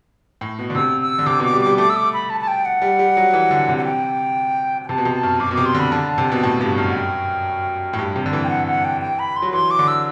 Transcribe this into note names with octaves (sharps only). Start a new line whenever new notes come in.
A2
B2
D3
C3 E6
E6
D3
C3 D6
B2
D6
G3
D6
G3
A3 D6
E6
D6
B5
A5
A5
G5
F#5
G3
G3
F#3
E3
D3
C3
F#5
G5
G5
C3 A5
B2
C3
A5
F#2
F#2 D6
B2
C3 D6
C6
D3 B5
D3 A5
C3
B2
A2
G2
F#2
F#5
G5
A2
G2
C3
D3
E3
G5
F#5
F#5
G5
G5
B5
C6
F#3
E3 C6
D6
D3
E6